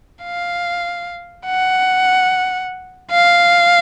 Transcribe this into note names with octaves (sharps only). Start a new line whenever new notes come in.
F5
F#5
F5